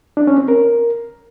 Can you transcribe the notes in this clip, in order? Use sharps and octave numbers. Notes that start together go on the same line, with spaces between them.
D4
C#4
C4
A#4